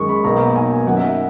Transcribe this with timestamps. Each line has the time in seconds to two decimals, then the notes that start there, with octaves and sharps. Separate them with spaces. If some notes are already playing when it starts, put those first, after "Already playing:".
Already playing: F#2 D#3 G#3 C#6
0.09 B5
0.24 B1 B2 A#3 D#4 A#5
0.56 G#5
0.87 F#2 D#3 F#3 F#5
0.97 E5